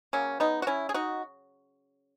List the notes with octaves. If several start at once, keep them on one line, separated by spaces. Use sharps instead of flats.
C#3 F#3 A#3 C#4
B3 D#4
F#4
C#4 E4
G#4
D#4 F#4